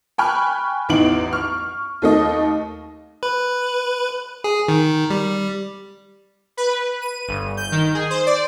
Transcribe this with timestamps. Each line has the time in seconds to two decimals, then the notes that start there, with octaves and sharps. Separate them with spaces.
0.18 G5 G#5 B5 C#6 F6 F#6
0.89 A1 E2 D#4 D7 F#7
1.33 C#6 F6
2.02 D#2 A3 D#5
3.23 B4
4.44 G#4
4.68 D#3
5.10 G3
6.57 B4
7.02 D#7
7.28 G1
7.57 G6
7.72 D#3
7.95 G#4
8.10 C5
8.26 D5